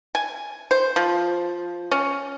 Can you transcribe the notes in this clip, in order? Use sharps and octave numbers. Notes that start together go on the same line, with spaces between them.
G#5
C5
F3
C#4